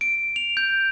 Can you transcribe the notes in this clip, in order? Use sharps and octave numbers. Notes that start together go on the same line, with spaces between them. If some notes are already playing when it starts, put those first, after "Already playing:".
D7
F7
G6